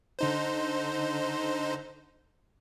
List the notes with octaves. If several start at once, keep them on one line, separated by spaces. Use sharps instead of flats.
D3 D#4 C5